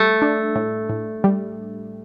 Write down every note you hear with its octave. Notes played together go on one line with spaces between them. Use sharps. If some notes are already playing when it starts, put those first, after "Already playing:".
Already playing: G3 A3
D4
A2
A2
G3